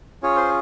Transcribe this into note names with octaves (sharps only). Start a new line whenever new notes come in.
C#4 F4 G#4 C#5
C5